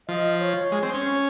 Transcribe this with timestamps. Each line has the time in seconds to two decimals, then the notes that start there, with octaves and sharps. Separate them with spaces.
0.08 F3 D#5
0.40 C#5
0.72 G#3
0.83 C4
0.94 C#4